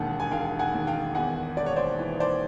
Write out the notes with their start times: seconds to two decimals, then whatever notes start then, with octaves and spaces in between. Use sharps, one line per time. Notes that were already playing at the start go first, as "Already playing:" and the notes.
Already playing: E1 D#2 F#5
0.20 G#5
0.31 E1 F5 G5
0.59 F#5 G#5
0.74 D#2
0.87 F5 G5
1.15 E2 F#5 G#5
1.57 E1 D5
1.66 C#5
1.76 C5 D5
1.99 E3
2.20 C5 D5